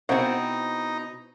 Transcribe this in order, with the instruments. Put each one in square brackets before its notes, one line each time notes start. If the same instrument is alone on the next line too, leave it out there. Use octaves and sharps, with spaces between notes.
[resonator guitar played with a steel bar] B2 C4 [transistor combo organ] D#4 [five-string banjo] E4 C5 F#5